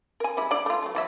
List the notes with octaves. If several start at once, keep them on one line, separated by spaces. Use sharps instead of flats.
A#4 G#5
G3 G#3 E4
D4 E4 D5
A3 F4
F#3 A3
E3 F#3 E5